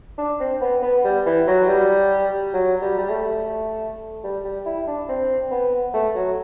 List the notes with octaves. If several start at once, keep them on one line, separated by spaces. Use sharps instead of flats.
D4
C4
B3
B3
G3
E3
F#3
G3
F#3
G3
G3
A3
G3
G3
E4
D4
C4
B3
A3
F#3